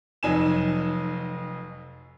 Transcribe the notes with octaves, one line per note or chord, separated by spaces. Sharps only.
F1 F2 F#3 D#4 G#5 E7